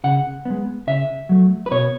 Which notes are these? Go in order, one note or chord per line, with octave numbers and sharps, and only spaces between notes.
C#3 F#5
G#3 B3
C#3 E5
F#3 A3
B4
B2 C#5